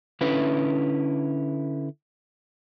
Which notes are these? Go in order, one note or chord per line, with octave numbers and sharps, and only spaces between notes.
D3 C#4 E4 B4